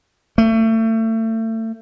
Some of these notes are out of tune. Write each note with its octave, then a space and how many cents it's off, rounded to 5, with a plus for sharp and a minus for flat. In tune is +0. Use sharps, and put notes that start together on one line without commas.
A3 +30